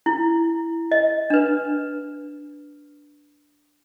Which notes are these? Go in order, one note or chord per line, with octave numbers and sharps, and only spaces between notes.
E4
D#5
D4 B4